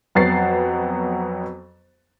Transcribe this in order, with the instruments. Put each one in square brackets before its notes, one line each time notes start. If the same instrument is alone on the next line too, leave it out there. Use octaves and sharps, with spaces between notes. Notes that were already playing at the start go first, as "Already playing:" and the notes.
[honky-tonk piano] F2 F#3 B3 F#4 A6 C7